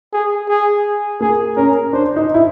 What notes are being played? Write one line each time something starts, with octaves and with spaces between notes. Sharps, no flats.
G#4
G#4
A#3 G#4
C#4 A#4
D4 C5
D#4
E4